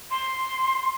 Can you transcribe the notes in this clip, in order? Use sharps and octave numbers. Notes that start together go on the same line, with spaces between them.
C6